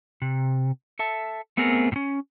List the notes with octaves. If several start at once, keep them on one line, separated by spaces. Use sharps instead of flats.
C3
A4 E5 A5
A3 B3 C4 G#4 A#4
A2 C#4